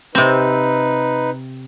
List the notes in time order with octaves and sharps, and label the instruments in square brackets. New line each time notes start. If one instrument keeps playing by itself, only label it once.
[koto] C3 C4 [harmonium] D#4 B4